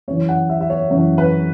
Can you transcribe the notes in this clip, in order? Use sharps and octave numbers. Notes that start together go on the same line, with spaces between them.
F#2 E3 C#5
F#5
E5
E5
C#5
F#2 E3 C#5
B4